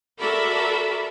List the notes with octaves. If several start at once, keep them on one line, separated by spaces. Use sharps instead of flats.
F#4 A4 A#4 D5 E5 B5